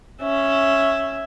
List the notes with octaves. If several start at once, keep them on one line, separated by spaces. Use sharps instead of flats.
C#4 E5